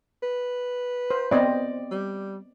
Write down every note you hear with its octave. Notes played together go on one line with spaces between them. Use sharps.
B4
C5
B3 C4 D5 D#5
G3